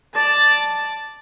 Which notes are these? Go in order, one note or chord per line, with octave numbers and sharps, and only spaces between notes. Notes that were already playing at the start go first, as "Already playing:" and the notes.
D5 A5